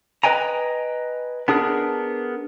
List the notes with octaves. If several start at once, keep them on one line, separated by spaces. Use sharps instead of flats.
B4 D#5 G5 G#5 A#5
B3 D4 G#4 A#4